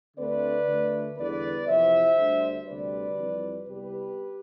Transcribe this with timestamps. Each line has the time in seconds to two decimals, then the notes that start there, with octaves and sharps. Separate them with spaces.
0.16 D2 D3 A3 C4 B4 D5
0.67 D2 D3 A3
1.16 E2 D3 G3 B3 B4 D5
1.66 F2 C3 E3 C5 E5
2.16 D2 D3 G3
2.66 D2 C3 G3 C4 B4 D5
3.17 F2 E3 G3 C4
3.66 C2 C3 G3 B3 G4 B4